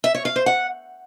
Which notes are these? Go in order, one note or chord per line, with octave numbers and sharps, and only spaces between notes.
E5
C#5
F5
C5
F#5